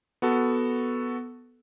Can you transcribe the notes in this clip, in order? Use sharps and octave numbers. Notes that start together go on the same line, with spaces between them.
B3 F#4 A4